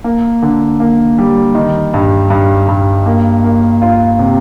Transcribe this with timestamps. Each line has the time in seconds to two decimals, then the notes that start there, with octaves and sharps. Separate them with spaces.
0.04 A#3
0.43 D3
0.80 A#3
1.18 G3
1.55 D#3
1.94 G2
2.30 G2
2.68 G2
3.06 A#3
3.44 A#3
3.82 F4
4.19 C3